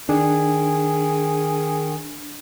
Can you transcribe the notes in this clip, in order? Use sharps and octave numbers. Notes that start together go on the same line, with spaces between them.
D#3 D4 G#4